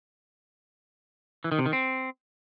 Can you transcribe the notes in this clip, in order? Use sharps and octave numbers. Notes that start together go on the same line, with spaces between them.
E3
D#3
C3
D#3
C4